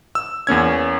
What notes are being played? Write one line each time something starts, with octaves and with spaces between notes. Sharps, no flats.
E6
E2 A#3 C#4 G#6